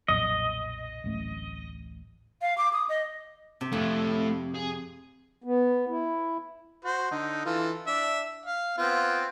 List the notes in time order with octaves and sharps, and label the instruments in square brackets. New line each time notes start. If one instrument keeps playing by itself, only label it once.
[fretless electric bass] B1 F2 A#2 [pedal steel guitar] D#5
[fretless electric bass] D1 A1 A3
[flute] F5
D6
D#6
D#5
[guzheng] C3
[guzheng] F2 [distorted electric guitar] A3 E4
[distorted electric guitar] G#4
[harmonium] B3
E4
[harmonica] F#4 C5
D3 D#4
E3 F4 A4
D4 E5
F5
B3 C4 F4